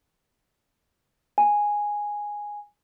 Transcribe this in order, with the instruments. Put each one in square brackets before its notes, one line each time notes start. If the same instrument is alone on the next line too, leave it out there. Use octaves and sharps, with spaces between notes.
[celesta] G#5